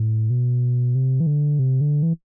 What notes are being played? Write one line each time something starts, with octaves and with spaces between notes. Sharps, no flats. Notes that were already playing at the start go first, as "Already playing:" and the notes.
Already playing: A2
B2
C3
E3
D3
C3
D3
E3